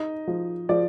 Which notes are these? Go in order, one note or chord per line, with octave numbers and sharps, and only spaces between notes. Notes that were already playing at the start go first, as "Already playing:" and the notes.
Already playing: D#4 D#5
F3
F3 D5